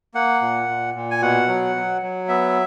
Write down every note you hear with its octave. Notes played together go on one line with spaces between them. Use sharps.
A#3 F#5
A#2
A#2
A#2
G#5
B2 F#5
F#3
F#3
F#3
B3 E5